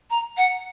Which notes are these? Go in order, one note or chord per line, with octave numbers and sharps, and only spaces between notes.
A#5
F#5